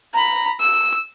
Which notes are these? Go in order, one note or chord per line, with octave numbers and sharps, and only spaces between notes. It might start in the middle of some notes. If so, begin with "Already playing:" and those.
A#5 B5
E6